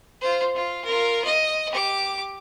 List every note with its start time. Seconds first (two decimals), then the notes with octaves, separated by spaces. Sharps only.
0.21 F4 C5
0.55 F4
0.85 F4 A#4
1.24 D#5
1.70 G4 D6